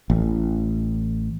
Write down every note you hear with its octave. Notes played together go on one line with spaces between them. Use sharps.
A1